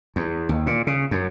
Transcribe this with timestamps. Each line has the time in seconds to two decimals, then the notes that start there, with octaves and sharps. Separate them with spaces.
0.16 E2
0.49 D#2
0.67 A#2
0.87 C#3
1.11 F#2